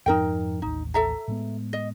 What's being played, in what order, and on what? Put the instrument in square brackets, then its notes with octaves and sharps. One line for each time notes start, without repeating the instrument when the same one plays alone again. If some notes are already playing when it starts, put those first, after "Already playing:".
[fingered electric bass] F2 G#2 F3 [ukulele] D#4 A#4 G5
[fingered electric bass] A1 D#2 [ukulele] D#4
[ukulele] A4 E5 A#5
[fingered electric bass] A2 G#3 B3
[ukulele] D#5